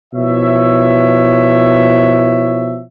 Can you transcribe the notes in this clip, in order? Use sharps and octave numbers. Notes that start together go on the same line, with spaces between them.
B2 F3 E4 C#5 E5